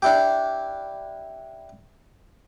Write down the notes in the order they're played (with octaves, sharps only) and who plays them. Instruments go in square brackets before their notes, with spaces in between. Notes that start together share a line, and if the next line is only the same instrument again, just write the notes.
[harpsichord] D4 E4 G4